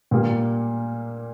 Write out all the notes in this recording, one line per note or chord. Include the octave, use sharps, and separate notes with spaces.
A#2 G3 A#3